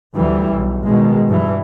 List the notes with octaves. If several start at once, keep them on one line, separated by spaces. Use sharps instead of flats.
D2 E3 G3
B1
B2 D#3 G#3
G2 E3